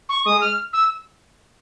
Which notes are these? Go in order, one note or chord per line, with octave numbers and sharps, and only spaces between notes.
C#6
G#3 D#6
F6
E6